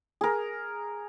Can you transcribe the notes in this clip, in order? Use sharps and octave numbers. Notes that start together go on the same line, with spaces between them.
G#4 A#4